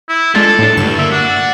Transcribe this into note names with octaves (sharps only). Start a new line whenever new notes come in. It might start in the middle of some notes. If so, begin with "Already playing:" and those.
E4
G#3 D4 F4 A4 A5
A2 D4
D2 G2 E7
A#3 E5
D4 F#4